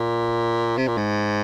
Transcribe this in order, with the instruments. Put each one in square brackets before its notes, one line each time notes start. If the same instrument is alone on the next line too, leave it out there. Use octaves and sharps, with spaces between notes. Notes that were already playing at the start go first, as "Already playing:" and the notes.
Already playing: [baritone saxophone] A#2
C3
A#2
G#2